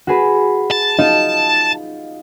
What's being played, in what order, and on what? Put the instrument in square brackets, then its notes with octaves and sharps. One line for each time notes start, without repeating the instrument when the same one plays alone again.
[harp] F#4 G#4 B4
[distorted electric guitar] A5
[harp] D#4 F4 D#5